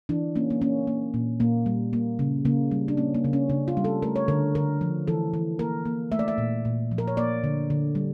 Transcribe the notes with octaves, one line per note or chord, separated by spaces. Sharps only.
E3 D4
A#3 C#4
A#3
A#3 C#4
A#3
A#2
A#2 A#3
G3
A#3
C#3
C#3 A#3
G3
D4
A#3 C#4
A#3
C#3
C#4
C#3 D4
F4
G3
A4
A3 A#4
C#5
D3 A#4
D3 A#4
F3
E3 A4
E3
A#3 A#4
A#3
A3 E5
D5
E5
A#2
A#2
F3
A#4
C#5
A#3 D5
D3
D3
G3